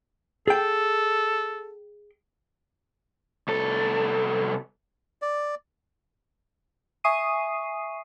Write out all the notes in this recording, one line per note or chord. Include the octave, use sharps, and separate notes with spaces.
G#4 A4 G5
C2 A4
D5
E5 G#5 C#6 D#6 C7 D#7